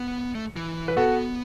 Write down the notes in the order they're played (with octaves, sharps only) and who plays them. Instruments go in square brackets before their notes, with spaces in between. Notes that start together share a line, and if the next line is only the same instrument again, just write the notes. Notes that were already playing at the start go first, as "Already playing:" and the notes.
Already playing: [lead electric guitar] B3
A3
E3
[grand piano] B4
[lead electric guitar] B3 [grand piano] F#4 A4